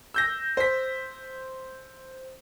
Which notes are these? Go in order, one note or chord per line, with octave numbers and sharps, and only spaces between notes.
E6 G6 A#6
C5 B6